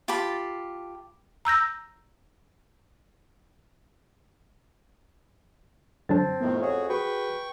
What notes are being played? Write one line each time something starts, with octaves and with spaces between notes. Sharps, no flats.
F4 G4 A5 B5
A#5 E6 G6 A#6
F#2 D3 F#3 C4 D4 A5 A6
F2 A2 D#3 B3
F2 F#4 G#4 C#5
F#4 G#4 B4 G5 B5 C#6